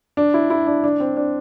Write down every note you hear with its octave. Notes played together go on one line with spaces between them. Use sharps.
D4
E4
E4
D4
D4
C4
D4